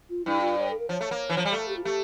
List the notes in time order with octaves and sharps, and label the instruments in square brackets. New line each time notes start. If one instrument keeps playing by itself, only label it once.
[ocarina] F4
[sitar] G2 [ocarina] E4
[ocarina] F4
C#5
A4
A#4
[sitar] F3 [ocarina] C#5
[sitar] A3
A#3
E3
F3
G3
[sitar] A3 [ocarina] A4
[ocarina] G4
F4
[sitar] A3 [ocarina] G4